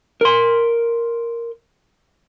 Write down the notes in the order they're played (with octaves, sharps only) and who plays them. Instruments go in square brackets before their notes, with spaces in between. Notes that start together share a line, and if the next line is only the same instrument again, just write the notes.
[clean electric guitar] A#4 C6